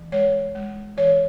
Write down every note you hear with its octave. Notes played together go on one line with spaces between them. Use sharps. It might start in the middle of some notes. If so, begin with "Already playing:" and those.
Already playing: E3
G#3 C#5
G#3
E3 C#5